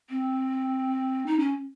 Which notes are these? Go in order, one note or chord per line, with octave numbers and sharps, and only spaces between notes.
C4
D#4
C#4